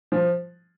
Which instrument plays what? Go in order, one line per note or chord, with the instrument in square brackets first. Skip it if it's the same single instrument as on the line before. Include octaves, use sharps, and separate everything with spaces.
[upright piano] F3